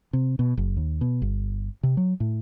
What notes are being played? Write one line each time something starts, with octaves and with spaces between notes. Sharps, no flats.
C3
B2
F#1
D#2
B2
G1
C3
F#3
A2